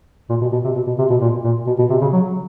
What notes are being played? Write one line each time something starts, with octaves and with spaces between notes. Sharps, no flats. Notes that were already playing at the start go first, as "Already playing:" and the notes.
A#2
B2
B2
C3
B2
B2
C3
B2
A#2
A#2
B2
B2
C3
C#3
F#3